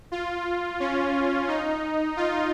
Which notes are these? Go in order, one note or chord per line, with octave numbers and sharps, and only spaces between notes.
F4
C#4
D#4
F4